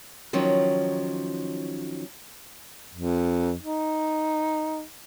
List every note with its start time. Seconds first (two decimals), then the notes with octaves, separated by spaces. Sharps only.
0.33 D#3 F3 F#3 C#4
2.94 F2
3.62 D#4